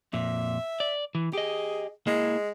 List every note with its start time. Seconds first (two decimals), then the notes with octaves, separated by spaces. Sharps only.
0.13 F2 A#2 E5
0.80 D5
1.15 E3
1.33 G4 G#4 D#5
2.07 G#3 A#3 E4